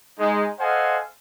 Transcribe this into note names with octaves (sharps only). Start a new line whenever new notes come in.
G#3 D#4
A4 C5 D#5 F5 F#5 G#5